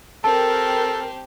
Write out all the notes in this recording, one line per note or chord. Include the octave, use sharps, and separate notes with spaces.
C4 G4 A4 A#4 A5